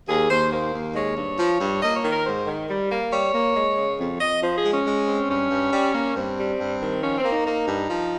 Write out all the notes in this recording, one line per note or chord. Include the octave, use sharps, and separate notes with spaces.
D#2 G#4
D#2 C5
A#3 C5
D#2
G#3 C#5
G2
F3
G2
A#3 D#5
C#5
D#3
A#4
G#2 C5
D#3
G3
A#3
G3 C#5
A#3
G#3
C#3
F2
F2 D#5
F3 C5
G#4
G#3
C#4
G#3
C4
G2 C#4
G2
G3
A#3
G2 C4
G3
G2
D#3
F3 C#4
C4
A#3
D#4
A#3
G2
F3